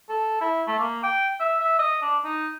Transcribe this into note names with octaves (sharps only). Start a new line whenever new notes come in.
A4
E4
A3
A#3
G5
E5
E5
D#5
D4
D#4